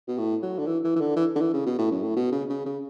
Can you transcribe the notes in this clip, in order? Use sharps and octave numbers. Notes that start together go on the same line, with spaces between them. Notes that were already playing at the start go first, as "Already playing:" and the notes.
B2
A2
F#3
D3
E3
E3
E3
D3
E3
D3
E3
C#3
B2
A2
F#2
A2
B2
C#3
C#3
C#3